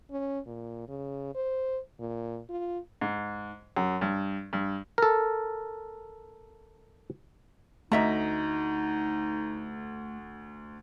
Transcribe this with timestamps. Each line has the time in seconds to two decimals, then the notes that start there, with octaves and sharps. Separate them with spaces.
0.11 C#4
0.47 A#2
0.88 C#3
1.35 C5
2.00 A#2
2.49 F4
3.01 G#2
3.77 F#2
4.01 G2
4.53 G2
4.98 A4 A#4
7.92 D2 A3 D#4 D#5 E5 A#5